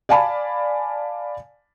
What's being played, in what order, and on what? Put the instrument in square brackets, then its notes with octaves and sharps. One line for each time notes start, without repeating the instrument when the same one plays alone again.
[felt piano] D5 F5 G#5 A5 B5